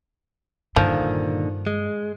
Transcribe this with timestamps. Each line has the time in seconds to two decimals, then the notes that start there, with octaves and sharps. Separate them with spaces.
0.76 G2 A#2 D3 D#3 F3
1.67 G#3